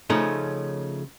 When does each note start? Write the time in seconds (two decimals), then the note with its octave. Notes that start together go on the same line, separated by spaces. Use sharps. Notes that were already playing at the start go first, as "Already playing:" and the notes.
0.10 C#3 F3 A3 C#4 D#4